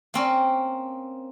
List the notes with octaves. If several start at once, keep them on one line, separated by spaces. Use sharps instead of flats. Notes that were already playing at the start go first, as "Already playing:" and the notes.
A#3 C4 C#4